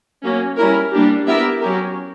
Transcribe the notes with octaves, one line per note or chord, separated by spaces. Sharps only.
F#3 A#3 C#4
G3 C#4 E4 A#4
G3 A#3 D4 G4
B3 E4 G4 A#4 E5
F#3 C#4 G4 A#4